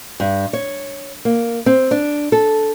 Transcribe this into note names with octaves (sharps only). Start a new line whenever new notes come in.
G2
C#5
A#3
C4
D4
A4